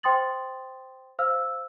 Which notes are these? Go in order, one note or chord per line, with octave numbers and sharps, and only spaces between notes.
C5 G5 C6 D#6 A6 F#7
C5 F5 E6 F6